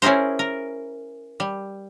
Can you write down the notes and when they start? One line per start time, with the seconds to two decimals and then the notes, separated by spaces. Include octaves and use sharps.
0.02 C#4 E4 G#4 A#4 C5
0.39 A#4
1.40 G3